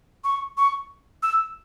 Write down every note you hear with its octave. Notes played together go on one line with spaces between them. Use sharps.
C#6
C#6
E6